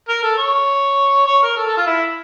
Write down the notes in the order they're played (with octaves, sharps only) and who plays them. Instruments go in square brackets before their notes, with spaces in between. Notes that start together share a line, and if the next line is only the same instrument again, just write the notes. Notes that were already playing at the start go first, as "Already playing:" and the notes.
[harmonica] A#4
A4
C#5
C#5
A#4
A4
A4
F4
E4